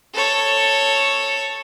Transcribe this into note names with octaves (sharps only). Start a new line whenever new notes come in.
A4 C#5